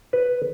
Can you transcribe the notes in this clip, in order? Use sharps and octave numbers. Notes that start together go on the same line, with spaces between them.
B4